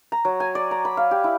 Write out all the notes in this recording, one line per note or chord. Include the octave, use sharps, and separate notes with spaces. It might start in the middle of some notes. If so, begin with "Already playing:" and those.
A#5
F#3
G#5
D5
A#5
B5
F5
G4
E4